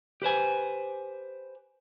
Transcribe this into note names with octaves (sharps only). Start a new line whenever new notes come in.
G4 B4 C5 G#5